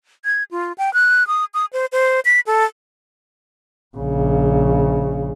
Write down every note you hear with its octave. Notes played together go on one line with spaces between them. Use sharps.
G#6
F4
G5
F#6
D#6
D#6
C5
C5
B6
A4
A#1 C#3